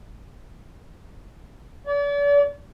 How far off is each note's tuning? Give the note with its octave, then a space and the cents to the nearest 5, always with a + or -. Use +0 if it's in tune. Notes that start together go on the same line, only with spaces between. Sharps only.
D5 -40